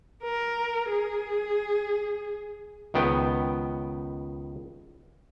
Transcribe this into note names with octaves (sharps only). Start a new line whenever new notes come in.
A#4
G#4
C#2 D#3 B3 G5